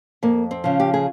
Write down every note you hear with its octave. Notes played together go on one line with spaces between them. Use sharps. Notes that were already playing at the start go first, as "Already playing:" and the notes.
F2 A#3
C4
C#3 F3
G4
G#4